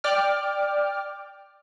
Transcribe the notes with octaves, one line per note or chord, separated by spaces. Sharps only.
D5 G5 D6 F6